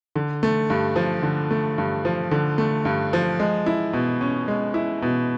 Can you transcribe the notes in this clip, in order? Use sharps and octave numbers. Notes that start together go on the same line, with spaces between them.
D3
A3
G2
F3
D3
A3
G2
F3
D3
A3
G2
F3
G#3
E4
B2
C#4
G#3
E4
B2